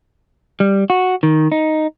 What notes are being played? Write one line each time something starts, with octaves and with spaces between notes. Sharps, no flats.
G3
F#4
D#3
D#4